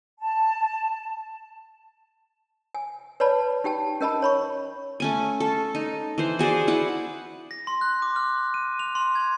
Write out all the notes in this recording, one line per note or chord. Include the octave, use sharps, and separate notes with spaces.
A5
G#5
B4 C#5 D5 A5 B5
D#4 G4 G5 A5
C#4 A#4 D#5 A5 B5
C#5 B5 C#6
A3 C#4 G#5
A4
D#4
E3 C5
F#4 G#4 C5 D5
E4 B4 F#5
A#6
C6
F#6
D6
F6
D#7
F7
C6
G#6